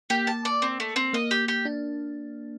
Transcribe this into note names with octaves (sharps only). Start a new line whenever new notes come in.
A#3 G4
A5
D5
C4
A3
C4
A#3 D#5
G4
G4
D4